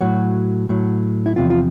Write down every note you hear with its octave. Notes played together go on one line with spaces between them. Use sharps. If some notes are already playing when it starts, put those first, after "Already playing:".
A2 F#3 F#4
A2 F#3
E4
E2 C3 F3 F4
F4